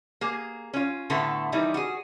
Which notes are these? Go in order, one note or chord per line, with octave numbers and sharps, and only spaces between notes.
A#3 G#4
C#4 F4
A2 D3 A3 B3 A4
D#3 E3 G3 D#4 E4
F#4 G#4